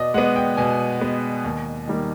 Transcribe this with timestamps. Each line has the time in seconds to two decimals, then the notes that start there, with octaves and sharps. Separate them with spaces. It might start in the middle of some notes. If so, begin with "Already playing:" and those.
Already playing: B2 D5 D#5
0.14 G#3 B3 F#5
0.36 G5
0.57 B2 G#5
1.01 G#3 B3
1.44 D#2
1.87 D#3 G3 A#3